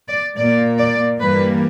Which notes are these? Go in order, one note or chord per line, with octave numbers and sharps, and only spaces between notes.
D5
A#2 A#3 D5
D5
G2 E3 G3 A#3 B4